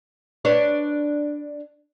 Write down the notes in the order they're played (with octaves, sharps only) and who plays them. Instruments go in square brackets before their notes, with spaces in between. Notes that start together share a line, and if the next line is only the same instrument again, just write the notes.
[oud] D4 B4 C#5